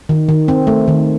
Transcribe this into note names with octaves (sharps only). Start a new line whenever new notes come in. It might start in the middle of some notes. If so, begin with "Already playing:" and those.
D#3
D#3
C4
A3
D#3